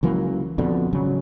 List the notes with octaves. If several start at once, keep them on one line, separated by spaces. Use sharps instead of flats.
C#2 E3 F#3 A#3
F2 B2 D3
G#1 C#3 F#3